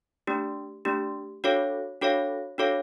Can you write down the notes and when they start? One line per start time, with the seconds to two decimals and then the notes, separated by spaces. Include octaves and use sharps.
0.27 A3 D4 G4
0.85 A3 D4 G4
1.44 D4 F#4 A4 C#5 F5
2.01 D4 F#4 A4 C#5 F5
2.58 D4 F#4 A4 C#5 F5